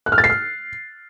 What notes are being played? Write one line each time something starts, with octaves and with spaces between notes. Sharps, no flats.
F#6
F6
A6
C7
F6